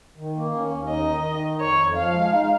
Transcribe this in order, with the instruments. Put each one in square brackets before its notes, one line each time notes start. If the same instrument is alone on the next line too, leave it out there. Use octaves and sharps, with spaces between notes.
[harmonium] D#3
A#3
C#4
D#2
[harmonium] D#4 [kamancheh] D#5
[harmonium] D#3
D#3
D#4
[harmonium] F2 [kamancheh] C#5
[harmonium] F2
[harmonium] F3 [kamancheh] F5
[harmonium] G#3
D#4